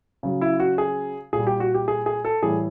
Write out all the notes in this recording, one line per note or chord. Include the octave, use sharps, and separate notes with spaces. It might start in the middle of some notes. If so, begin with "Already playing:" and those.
C#3 F#3
E4
F#4
G#4
A#2 G3 G#4
G4
F#4
G4
G#4
G#4
A4
A2 E3 G3 G#4